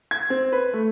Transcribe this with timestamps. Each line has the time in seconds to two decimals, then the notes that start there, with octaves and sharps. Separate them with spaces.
0.11 G#6
0.30 C4
0.53 B4
0.73 A3